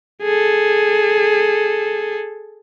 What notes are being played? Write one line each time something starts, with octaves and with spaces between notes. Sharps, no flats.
G#4 A4